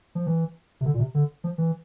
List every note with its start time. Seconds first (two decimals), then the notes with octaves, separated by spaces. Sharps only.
0.15 F3
0.26 E3
0.81 C3
0.85 D3
0.94 A#2
0.99 C3
1.15 D3
1.44 F3
1.58 E3